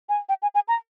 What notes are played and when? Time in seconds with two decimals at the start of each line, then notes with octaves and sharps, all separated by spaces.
0.09 G#5
0.29 G5
0.42 G#5
0.55 G#5
0.68 A#5